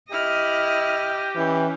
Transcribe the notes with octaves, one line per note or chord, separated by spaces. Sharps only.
E4 G4 D#5 F6
E3 C#4